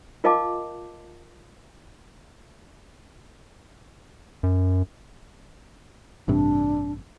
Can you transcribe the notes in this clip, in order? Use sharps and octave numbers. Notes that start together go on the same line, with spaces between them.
F4 A#4 D#5 F5 A5 D6
F#2
A1 G2 C3 D4